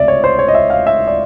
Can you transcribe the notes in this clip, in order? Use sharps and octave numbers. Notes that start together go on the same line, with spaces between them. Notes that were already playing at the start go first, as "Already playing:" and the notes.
Already playing: C#2 C3 D5 E5
C#5
C5
C#5
D#5
E5
F5
E5
D5